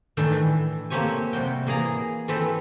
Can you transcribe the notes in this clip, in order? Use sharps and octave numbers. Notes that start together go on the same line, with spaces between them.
A2 D#3 E3 A3 D4 G5
E3
A3 A#3 C4 G4 C#5 G#5
C3 G3 F#4 G5
E3 A#3 G#4 D5 A#5
E3 A3 C4 G4 A4 B4